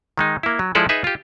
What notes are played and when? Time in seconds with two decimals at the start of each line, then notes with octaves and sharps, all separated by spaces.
0.18 D#3 G#3 D#4
0.43 A#3 E4
0.59 F#3
0.75 F3 G#3 E4 G#4 A4 D5
0.89 D#4 G#4 B4 E5
1.04 F4 G4